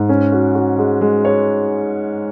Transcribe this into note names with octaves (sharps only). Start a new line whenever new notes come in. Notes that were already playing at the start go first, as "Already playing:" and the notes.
Already playing: G#2
C#4
F#4
F#4
G#3
G#3
C#5